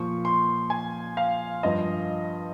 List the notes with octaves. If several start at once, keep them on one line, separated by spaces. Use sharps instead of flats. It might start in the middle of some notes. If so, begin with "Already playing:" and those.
Already playing: A#2 F3 C#6
C6
G#5
F5
G2 F3 D#5